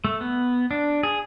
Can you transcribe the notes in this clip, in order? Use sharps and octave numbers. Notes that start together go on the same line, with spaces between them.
A3
B3
D4
G#4